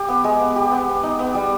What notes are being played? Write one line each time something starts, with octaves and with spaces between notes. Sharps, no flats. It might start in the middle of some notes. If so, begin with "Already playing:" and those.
Already playing: G4
B3
G#3
B3
G4
B3
B3
D#4
B3
G3